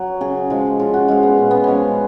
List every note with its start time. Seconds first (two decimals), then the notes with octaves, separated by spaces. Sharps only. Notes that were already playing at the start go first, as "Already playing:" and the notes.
Already playing: F#3
0.21 C#3 G#4
0.50 F3 G#3
0.79 C#3 F4
0.94 F#4
1.08 F3 G#3 F4
1.23 B3
1.38 A#2 C#4
1.51 B3
1.64 F3 G#3 C#4